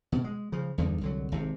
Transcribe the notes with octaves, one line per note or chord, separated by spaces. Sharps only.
B2
G#3
C#3 F3
E2 G2 D3 D#3
C2 D3 F#3
G#1 C3